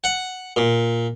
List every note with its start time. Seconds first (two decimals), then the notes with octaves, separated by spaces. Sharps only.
0.04 F#5
0.56 A#2